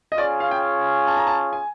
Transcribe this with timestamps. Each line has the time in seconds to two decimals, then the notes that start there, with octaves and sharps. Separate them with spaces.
0.12 D#5
0.18 C#4 F4 G#4 C#5 D5
0.40 F5
0.51 G5
1.07 A5
1.17 A#5
1.27 A5
1.53 G#5